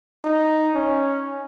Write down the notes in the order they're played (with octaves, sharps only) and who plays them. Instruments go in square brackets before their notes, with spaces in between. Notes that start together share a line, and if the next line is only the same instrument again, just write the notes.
[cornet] D#4
C#4